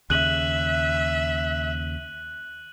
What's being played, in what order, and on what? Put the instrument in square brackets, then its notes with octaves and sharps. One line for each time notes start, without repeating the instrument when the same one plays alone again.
[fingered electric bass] D#2 C#3 [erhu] E5 [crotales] F#6 D#7 F#7